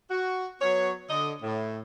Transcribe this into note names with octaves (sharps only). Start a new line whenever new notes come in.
F#4
F#3 B3 C#5
D3 D#5
A2